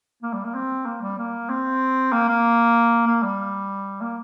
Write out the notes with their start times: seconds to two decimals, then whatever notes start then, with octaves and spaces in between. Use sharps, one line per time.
0.22 A#3
0.33 G3
0.45 A#3
0.55 C4
0.86 A#3
1.01 G3
1.18 A#3
1.49 C4
2.12 A#3
2.28 A#3
3.07 A#3
3.23 G3
4.01 A#3